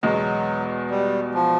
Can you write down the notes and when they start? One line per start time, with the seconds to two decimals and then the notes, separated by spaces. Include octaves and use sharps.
0.03 E2 B2 F#3 G#3 B3
0.90 G3
1.34 F3